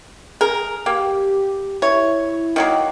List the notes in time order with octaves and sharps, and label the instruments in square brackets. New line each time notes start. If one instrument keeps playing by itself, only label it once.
[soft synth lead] G#4 [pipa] A#4
[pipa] A#3 [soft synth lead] G4
[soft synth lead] E4 [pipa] C#5
[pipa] D#3 F#3 A#3